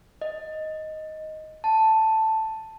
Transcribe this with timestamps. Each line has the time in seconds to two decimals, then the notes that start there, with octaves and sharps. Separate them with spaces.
0.22 D#5
1.64 A5